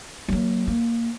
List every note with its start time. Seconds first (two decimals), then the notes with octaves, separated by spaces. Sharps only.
0.28 F#3 A#3
0.68 A#3